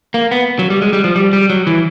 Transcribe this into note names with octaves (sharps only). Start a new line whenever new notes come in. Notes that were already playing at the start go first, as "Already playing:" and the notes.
A#3
B3
F#3
G3
G#3
G3
F3
G3
G3
F#3
E3